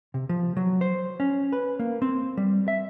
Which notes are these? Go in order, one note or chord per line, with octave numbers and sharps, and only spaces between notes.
C3
F3
F#3
C5
C#4
B4
A#3
C4
G3
E5